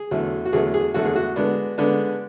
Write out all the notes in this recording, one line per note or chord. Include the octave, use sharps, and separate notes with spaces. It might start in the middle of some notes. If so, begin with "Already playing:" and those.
Already playing: G#4
E2 D3 F#3 A3
F#4
E2 D3 F#3 A3 G#4
G#4
E2 D3 F#3 A3 F#4
G#4
F#4
D3 G#3 B3 D4
D3 G#3 B3 D4